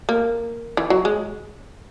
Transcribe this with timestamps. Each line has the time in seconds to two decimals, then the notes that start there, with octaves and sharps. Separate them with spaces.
0.09 A#3
0.77 E3
0.90 F#3
1.05 G#3